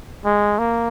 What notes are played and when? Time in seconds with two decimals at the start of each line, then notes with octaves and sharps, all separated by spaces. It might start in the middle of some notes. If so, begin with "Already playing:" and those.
0.25 G#3
0.59 A#3